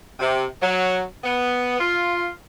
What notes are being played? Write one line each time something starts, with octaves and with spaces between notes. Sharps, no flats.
C3
F#3
B3
F4